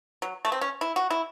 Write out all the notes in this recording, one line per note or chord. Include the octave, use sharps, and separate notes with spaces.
F#3
A3
C4
C#4
E4
F#4
E4